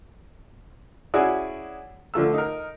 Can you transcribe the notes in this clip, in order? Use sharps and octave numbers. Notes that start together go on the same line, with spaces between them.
C#4 E4 F#4 G#4 D5
D3 F3 A3 E6
D#4 A#4